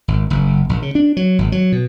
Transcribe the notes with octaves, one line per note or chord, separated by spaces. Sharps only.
G#1
F#1
A#1
C#3
D4
F#3
G#1
F#3
B2